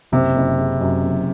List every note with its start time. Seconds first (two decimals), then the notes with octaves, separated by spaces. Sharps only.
0.12 F#1 C3
0.36 F#1
0.58 C#3
0.81 F#2
1.03 F#1